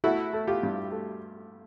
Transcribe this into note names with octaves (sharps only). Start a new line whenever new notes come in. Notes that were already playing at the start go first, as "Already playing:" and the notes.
A3 E4 F#4
A3
F4 G4
G2
A3